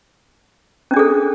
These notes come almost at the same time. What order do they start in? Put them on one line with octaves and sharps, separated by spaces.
C#4 D4 G#4 A4